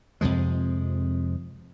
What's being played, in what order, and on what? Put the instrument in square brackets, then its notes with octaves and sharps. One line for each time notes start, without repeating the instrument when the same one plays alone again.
[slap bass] F2 C3 F3 G#3